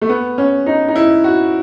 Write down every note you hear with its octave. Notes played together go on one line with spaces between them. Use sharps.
A3
B3
C#4
D#4
D#4
E4
F#4